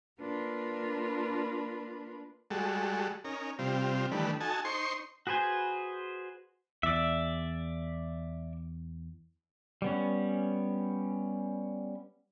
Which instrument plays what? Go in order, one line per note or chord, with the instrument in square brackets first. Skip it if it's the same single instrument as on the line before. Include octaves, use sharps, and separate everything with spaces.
[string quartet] A#3 D4 F4 A#4 B4
[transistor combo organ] G3 G#3 F#4 A4
C#4 D#4 A#4
C3 G3 C4 F4
D#3 E3 G3 A3 D4 B4
D#4 F#4 A4 G#5 A5
D#4 C5 C6 C#6
[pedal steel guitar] F#4 G#4 B4 C5 G#5
[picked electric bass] E2 [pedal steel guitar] D5 E5
[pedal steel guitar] G3 B3 C#4